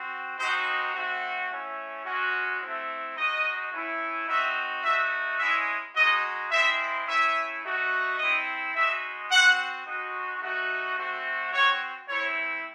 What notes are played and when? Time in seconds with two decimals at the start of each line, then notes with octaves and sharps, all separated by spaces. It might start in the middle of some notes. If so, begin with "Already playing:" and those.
Already playing: C4 F#4
0.37 G#3 C4 D#4 F#4 C5
0.94 A3 C4 F#4
1.50 A3 C#4 E4
2.05 G#3 C#4 F#4
2.61 A3 C4 E4
3.16 G#3 D#4 F#4 D#5
3.72 A3 C#4 E4
4.27 C4 D#4 F#4 E5
4.83 A3 D#4 F#4 E5
5.39 G#3 C#4 E4 E5
5.95 G#3 D#4 F#4 D#5
6.51 G#3 C4 E4 E5
7.06 A3 C#4 E4 E5
7.62 A3 D#4 F#4
8.18 C4 E4 D#5
8.74 G#3 D#4 F#4 E5
9.30 C4 F#4 F#5
9.85 G#3 D#4 F#4
10.41 A3 D#4 F#4
10.97 A3 C4 F#4
11.52 C4 F#4 C#5
12.09 A3 C4 E4 C#5